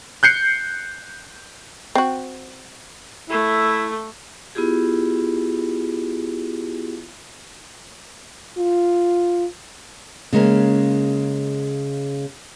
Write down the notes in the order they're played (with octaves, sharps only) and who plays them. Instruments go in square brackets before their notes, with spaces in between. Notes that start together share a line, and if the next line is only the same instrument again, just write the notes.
[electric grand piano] F#6 G6 C7 C#7
[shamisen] C4 F#4
[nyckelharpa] A3 [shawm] E4
[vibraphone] B3 E4 F4 G4 G#4
[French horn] F4
[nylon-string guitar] C#3 G#3 A#3 C#4